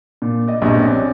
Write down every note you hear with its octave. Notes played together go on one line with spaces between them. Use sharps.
A#2
D5 D#5
A#1 G2 B2 D#5
C4 C#4 D5